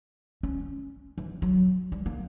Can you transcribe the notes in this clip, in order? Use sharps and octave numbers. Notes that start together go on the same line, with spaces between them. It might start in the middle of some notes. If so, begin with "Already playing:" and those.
C#4
E3
F#3
G3
A#3